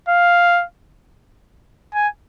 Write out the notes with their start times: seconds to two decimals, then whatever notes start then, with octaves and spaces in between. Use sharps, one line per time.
0.09 F5
1.94 G#5